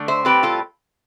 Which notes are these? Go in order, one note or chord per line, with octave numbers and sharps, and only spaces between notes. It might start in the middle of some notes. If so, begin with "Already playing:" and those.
Already playing: D3 A3
C5 E5
A2 G3 C4 G4 B4
F4 A4